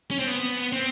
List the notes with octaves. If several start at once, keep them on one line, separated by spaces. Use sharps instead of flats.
C#4
C4
B3
C4